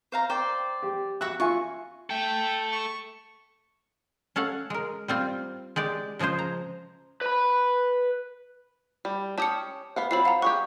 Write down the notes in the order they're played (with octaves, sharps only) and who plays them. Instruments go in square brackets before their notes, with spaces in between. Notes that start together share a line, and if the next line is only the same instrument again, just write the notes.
[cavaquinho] C5 F5 A#5
C5 D5 G5
[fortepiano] G4
[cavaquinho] F#4 E5 [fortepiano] F#6
[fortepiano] F4 E5 G#5 [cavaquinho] C#6
[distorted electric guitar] A4 E5 [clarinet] G5
[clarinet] C#6
[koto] C#4 A4 F5 F#5
G#3 A#4
G3 C4 F4
G#3 G4 D5
C#3 F3 G#3 G#4 C5
A#5
[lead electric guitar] B4 B5
[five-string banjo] G3
[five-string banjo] C#4 G4 [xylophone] A5 D#6 C#7
[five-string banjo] B3 F5 F#5
[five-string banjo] F#3 C4 F4 [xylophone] B5 C7
[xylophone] F5 F#5 A#5
[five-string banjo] G4 G#4 F#5 [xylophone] C#6